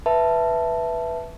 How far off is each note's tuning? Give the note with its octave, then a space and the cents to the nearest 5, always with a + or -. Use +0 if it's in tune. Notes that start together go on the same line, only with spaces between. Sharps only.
B4 -5 E5 +0 A5 +0